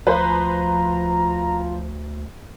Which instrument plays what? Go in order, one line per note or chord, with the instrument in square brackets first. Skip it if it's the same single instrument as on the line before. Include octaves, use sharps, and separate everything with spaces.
[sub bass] D2 [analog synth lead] F3 [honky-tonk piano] B4 C5 [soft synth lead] A#5